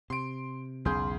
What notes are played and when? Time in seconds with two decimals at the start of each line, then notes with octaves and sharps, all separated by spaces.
0.10 C3 C6 D7
0.85 B1 E2 C#3 G#4 C6 G6